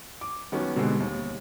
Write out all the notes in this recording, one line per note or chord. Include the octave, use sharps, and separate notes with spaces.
D6
D#3 F#3 B3 C#4
B2 D3 G3 G#3 C4
D#2